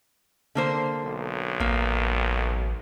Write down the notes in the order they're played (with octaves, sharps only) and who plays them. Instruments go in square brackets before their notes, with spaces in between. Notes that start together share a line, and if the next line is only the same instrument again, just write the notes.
[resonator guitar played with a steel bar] D3 A#3 C5
[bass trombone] B1
[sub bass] A1 [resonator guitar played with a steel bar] A#3